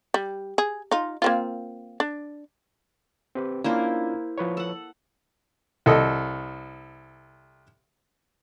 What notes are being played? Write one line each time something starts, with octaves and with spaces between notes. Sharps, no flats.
G3
G#4
D#4 F4
A#3 C4 F4
D4
C4 G4 B4
A#3 C#4 D4 E4 F4 C5
F3 B4 C#5
A4 F#5
C2 A4 D#5